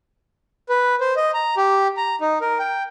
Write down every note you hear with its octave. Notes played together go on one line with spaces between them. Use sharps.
B4
C5
D#5
A#5
G4
A#5
D#4
A#4
G5